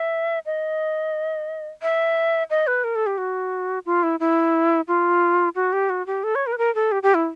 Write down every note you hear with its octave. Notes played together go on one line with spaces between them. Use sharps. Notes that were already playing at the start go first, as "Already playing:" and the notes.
Already playing: E5
D#5
E5
D#5
B4
A#4
A4
G4
F#4
F4
E4
E4
F4
F#4
G4
F#4
G4
A4
C#5
A#4
B4
A#4
A4
G4
G4
E4